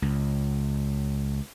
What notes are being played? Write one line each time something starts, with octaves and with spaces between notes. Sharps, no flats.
C#2